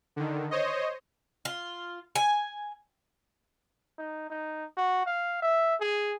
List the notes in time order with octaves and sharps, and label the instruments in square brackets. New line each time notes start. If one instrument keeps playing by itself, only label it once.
[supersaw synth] D3 D#3
C5 C#5 D#5
[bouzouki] F4
G#5
[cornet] D#4
D#4
F#4
F5
E5
G#4